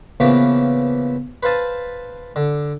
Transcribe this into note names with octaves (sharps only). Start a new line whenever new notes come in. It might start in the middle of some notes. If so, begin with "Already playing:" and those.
C#3 E3 F3 A#3 B3 C#4
B4 C5 F5 A5 D#6
D3